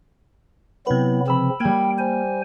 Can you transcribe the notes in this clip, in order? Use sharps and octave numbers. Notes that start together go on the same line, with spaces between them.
C3 F#3 B3 E4 B4
C#3 F3 C4 B5 E6
G3 A#3 G5 G#6
C5 G#5